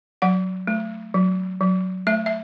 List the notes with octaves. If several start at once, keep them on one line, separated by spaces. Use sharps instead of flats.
F#3 F#5
A3
F#3
F#3
A3 E5
E5